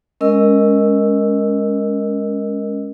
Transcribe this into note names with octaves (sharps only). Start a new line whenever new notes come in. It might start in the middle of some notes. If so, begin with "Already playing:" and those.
G#3 C#4 A#4 D#5 E6